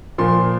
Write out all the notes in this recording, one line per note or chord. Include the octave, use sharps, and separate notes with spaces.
A#2 F3 A#3 C6